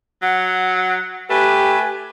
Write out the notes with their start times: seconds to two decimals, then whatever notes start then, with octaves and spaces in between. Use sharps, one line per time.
0.22 F#3 F#5
1.30 A3 G4 B4 G#5